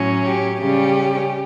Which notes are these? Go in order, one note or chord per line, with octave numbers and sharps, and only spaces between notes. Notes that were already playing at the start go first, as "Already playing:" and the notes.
Already playing: A2 F#3 C#4
G4
C#3 G3 C#4 G4